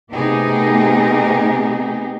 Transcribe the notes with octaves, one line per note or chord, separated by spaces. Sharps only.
C3 A3 B3 D#4 G4 G#4